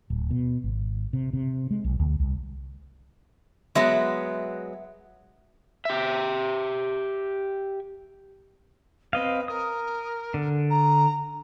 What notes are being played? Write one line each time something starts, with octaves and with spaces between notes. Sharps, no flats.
D1
B2
G#1
C3
C3
G#3
B1
D2
C2
F#3 G#3 B3 E5
G4 E5
C4 B4 D#5 F5
A#4 D#6
D3
A#5